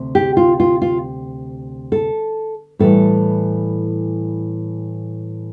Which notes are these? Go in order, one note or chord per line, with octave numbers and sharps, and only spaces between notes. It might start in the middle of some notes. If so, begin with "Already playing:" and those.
Already playing: D2 C3
G4
F4
F4
F4
A4
A2 E3 G3 A4